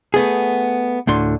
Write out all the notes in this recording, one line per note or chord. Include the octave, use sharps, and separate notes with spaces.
A3 B3 G#4
D2 A2 D3 C6